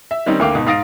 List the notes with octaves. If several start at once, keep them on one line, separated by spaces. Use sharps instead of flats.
E5
D#3 G3 C4 C#4 D#4
D2 D3 A#3 F5 G5 D6
G#2 B2
G#2 F5 D#6 A6 A#6 D7